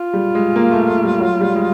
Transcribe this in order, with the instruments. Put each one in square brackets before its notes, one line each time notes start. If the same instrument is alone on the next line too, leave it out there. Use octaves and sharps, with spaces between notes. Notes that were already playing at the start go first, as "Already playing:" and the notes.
Already playing: [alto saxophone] F4
[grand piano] G3
G#3
A#3
A3
A3
G3
F#3
G3
G#3